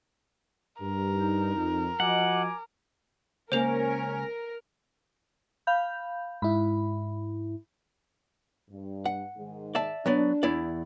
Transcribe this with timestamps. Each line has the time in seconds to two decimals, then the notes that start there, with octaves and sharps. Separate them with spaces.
0.81 G2 A#4
1.12 D#4
1.55 F2
2.00 F3 F#4 D#5 F#5 G#5 D6
3.52 C#2 A#3 C#4 A#4 C5 F7
5.67 F5 B5 G6
6.42 G#2 E4 B5
8.70 G2
9.06 F#5
9.36 G#2 D#3 G#3
9.75 D5 E5 A5
10.06 F#3 B3 D4 D5
10.43 E2 E4 D5